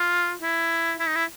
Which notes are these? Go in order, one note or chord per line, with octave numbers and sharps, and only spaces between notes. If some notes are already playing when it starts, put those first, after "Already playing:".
Already playing: F4
E4
E4
D#4
E4